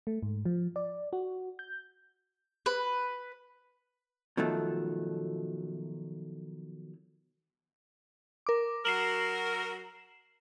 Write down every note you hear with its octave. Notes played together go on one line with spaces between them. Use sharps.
A3
G#2
F3
D5
F#4
G6
B4
B2 D#3 F3 F#3 A3
A#4 D6
F#3 F#4 A#4 C7 E7 F#7